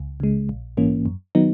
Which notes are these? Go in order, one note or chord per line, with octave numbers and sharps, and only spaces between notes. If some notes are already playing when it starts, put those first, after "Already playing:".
Already playing: C#2
C#3 G#3
A#1
G#2 E3 A#3 C#4
F#2
D#3 F#3 B3 D#4